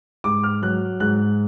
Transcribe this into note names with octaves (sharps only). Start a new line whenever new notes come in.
G#2 D6
F6
F#3 F#6
G#2 F#6